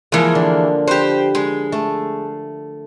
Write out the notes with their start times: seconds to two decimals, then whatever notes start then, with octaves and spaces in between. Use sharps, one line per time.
0.12 E3 F3 G#3 A#3
0.35 D3
0.87 G4 B4 C5
1.35 G#3
1.72 A3